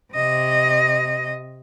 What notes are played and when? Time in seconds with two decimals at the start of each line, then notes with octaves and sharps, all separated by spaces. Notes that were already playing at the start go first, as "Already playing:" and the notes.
0.14 C3 D#5